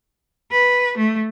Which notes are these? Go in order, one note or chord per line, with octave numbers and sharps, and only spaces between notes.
B4
A3